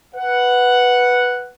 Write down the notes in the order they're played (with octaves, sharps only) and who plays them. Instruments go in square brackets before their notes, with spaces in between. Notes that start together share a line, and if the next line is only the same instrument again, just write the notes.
[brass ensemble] B4 F#5